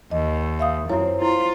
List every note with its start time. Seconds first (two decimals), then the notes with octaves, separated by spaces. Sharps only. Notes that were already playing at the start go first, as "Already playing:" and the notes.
0.11 D#2 D#5
0.60 E5 F5 D#6
0.90 F#2 F3 C4 E4 F#4 C#5 E5
1.22 E4 F4